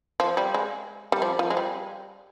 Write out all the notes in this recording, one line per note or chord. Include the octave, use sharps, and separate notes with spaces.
F3
G3
G#3
G3
F3
F3
G#3
G3